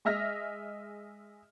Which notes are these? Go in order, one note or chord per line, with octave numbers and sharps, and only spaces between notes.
G#3 D#5 E5 F6 A#6